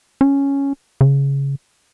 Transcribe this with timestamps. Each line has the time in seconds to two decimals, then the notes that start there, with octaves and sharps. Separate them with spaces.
0.21 C#4
1.01 C#3